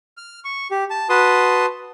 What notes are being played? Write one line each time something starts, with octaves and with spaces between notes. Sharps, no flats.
F6
C#6
G4
A5
F#4 B4 A5 C6 D#6